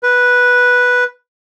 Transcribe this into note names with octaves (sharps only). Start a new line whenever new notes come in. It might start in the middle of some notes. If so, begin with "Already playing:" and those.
B4